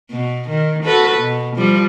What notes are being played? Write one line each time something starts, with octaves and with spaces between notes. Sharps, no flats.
B2
D#3
F#4 A4 B4
B2
F3 G3